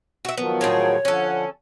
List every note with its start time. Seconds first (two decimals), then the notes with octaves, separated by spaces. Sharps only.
0.25 F#4 E5
0.37 D#3 F3 F#3 B3
0.61 A2 C4 G#4 C#5
1.05 D3 F3 C#4 A4 F#5